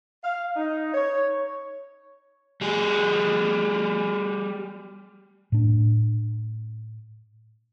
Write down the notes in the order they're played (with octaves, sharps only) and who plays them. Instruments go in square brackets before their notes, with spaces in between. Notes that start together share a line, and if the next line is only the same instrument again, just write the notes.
[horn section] F5
D#4
C#5
[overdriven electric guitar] G3 G#4
[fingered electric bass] A2 D4